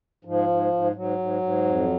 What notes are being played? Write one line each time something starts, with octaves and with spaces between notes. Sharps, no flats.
G#2 F3
G#2
G#2
G#2 F#3
G#2
G#2
F2